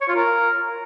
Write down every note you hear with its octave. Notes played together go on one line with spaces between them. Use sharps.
C#5
F4
A#4